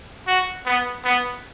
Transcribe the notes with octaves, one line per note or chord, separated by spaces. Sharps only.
F#4
B3
B3